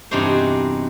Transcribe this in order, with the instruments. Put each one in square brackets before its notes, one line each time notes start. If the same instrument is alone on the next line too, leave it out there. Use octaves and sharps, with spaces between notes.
[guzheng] E2 G2 C3 D#4 F#4 C5